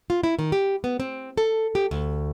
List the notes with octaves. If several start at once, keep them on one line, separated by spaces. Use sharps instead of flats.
F4
E4
D#3
G4
B3
C4
A4
G4
D2